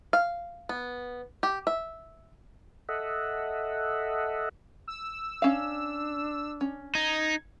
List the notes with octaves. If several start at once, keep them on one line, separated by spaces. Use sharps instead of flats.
F5
B3
G4
E5
A4 D#5 E5 F#5
E6
C#4 D4 F5
C#4
D#4 G#6